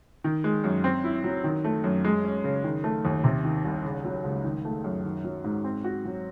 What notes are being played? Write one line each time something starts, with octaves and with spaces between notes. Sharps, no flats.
D#3
G#3
F#2
C4
E4
F#3
D#3
A3
F#2
G#3
C#4
C#3
D#3
A3
D#2
C3
D#3
C2
C#3
F#3
C#2
D#3
A3
F#2
D#3
F#3
G#2
C4
F#4
F#3